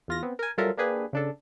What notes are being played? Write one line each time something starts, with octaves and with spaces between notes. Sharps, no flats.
E2 F4 A#6
B3 C4
A#4 G#5
F#3 G3 F4 A4 A#4 E5
A#3 D4 G4 G#4 B4
C#3 D4 A4